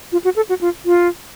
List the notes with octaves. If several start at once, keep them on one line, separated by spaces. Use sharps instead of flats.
F4
F#4
A4
F#4
F4
F4